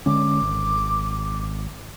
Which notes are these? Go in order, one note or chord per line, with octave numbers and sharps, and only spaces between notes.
D3 G#3 C#4 D6
G#1